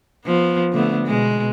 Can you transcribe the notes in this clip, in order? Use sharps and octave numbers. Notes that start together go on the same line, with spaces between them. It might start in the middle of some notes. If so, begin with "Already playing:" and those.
F3 B3
D3 A3 B3
B2 G#3